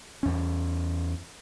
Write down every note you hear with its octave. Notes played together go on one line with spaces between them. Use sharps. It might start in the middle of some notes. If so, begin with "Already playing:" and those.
E2 C#4